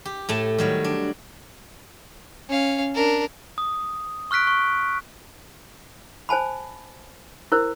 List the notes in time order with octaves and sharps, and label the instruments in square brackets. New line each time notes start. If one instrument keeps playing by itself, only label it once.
[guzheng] G4
A2 A3 A5
D#3 F#3 G3
D4
[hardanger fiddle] C#4 F5
D4 A#4
[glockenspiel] D#6
C#6 F6 F#6 B6 D7
C#6
[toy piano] C5 G#5 A5 B5
E4 A#4 C5